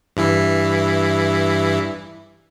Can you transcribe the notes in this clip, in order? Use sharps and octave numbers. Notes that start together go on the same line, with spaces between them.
G2 E3 E4